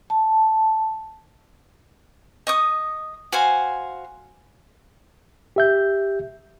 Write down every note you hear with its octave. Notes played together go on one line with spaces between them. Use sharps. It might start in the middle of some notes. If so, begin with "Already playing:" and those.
A5
D#5 C#6 D#6
F#4 C5 F5 G#5
G4 E5 G6